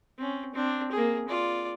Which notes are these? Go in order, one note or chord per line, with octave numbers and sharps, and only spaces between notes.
C4 C#4
C4 D4
A#3 G#4
F4 D5